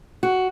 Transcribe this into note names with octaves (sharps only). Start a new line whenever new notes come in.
F#4